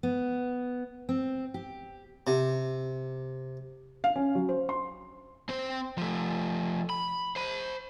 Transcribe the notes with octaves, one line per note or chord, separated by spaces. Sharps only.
B3
C4
G4
C3
F5
C#4
F#3
C5
C6
C4 C5
F3 A3
B5
C5 B5